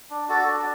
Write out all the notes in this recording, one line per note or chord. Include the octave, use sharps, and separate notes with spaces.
D4
F#4 A4 D5
D4